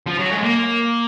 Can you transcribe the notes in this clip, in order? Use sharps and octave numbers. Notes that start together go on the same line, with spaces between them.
F3
F#3
G#3
A#3